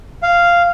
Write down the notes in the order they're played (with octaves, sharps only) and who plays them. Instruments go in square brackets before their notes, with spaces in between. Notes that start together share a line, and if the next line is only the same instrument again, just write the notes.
[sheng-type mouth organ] F5